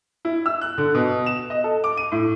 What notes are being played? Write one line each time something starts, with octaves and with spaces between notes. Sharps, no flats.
E4
E6
F#6
D3
B2
E7
D#5
A4
D6
D#7
A2